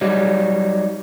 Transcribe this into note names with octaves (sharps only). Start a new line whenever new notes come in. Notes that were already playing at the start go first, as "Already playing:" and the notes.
F#3 G3 D#4